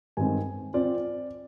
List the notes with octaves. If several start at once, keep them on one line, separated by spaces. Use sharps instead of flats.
G2 D#3 G#3 C4 G#5
C4 F4 D5